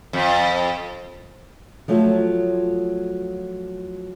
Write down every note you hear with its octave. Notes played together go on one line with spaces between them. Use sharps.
F2
F3 F#3 A3 F4